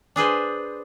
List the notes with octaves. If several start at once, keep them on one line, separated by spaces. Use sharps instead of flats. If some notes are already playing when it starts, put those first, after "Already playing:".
D4 G#4 B4 C5